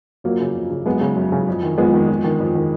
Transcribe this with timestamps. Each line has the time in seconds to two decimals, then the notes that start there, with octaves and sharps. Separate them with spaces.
0.24 F2 F#3 A#3
0.40 C#3
0.55 F2
0.71 C#3
0.86 F#2 G#3 B3
1.01 C#3
1.16 F#2
1.32 C#3
1.48 F2
1.63 D#3
1.78 F2 G#3 B3
1.94 D#3
2.08 F2
2.24 D#3
2.40 F2
2.55 D#3